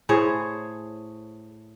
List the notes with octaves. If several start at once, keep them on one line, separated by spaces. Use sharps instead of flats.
A2 G#4 C5 C#5